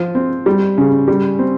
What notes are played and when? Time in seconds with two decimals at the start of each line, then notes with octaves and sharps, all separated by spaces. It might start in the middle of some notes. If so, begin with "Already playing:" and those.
Already playing: F3
0.15 C4
0.46 G3
0.78 C#3
1.08 G3
1.39 C4